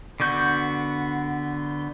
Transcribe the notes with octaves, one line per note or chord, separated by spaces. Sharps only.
D3 B3 F#4 G6